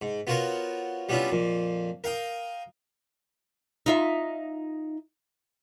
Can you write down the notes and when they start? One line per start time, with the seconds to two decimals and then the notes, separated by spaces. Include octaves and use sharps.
0.02 G#2
0.27 B3 F4 F#4 A#4 C5 C#5
1.09 G3 B3 C#4 D4 E4 F4
1.32 F2 A#2
2.04 A#4 F5 G5 D#6
3.86 D#4 F4 E5